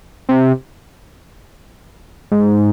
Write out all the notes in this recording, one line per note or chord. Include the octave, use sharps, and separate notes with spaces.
C3
G#2